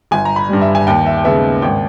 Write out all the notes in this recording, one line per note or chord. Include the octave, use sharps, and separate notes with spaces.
G1 G#5
A#5
B5
G2 G3
E5
G#5
D#2 G5
E5
G5
C#3 G#3 B3 E5
G#1 G5